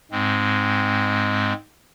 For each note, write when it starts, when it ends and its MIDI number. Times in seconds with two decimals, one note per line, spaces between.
0.12 1.53 44
0.12 1.53 56
0.12 1.53 60